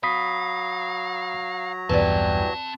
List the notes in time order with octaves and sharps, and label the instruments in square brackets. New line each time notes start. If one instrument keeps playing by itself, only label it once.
[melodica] F#3 A#5 [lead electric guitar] F5 [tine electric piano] B5 D#6 B6
[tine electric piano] B1 E2 G2 [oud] E3 G3 [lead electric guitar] C4 A5